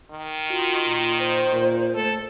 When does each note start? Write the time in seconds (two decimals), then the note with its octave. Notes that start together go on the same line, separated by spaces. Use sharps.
0.11 D#3
0.50 F4 F#4
0.87 A#2
1.19 C5
1.53 A#2
1.95 A3 A4